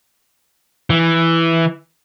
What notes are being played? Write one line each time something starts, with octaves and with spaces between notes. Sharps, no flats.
E3